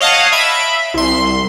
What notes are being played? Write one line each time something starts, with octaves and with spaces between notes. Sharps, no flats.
C#5 D#5 F5 F#5 A5
E5 B5 D7
C2 C6